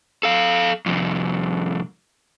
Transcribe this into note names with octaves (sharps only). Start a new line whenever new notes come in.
A4 F5
C2 F2